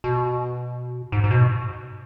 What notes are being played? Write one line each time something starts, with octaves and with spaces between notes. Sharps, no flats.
B2
G#2
G#2
B2